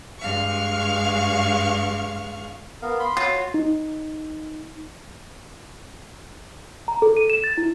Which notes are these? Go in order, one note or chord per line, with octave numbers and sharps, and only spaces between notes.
G2 G#3 F5 C#6
B3 A#4 F5
B5 C6
F4 F#4 C#5
D#4
A#5
A4
D#7
E7
A6
E4